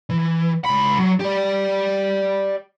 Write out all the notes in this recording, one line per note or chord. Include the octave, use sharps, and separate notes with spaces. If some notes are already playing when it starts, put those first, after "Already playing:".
E3
C#2 B5
F#3
G4 D5